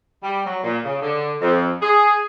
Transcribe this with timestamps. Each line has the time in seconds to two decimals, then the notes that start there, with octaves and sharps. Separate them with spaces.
0.23 G3
0.45 F#3
0.64 A#2
0.85 C#3
1.02 D3
1.41 F2
1.81 G#4